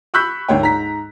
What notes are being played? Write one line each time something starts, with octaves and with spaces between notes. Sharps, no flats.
B5 C#6 E6 F#6 G6 B6
G#1 D2 C#5 G5
G#2 A#5 B6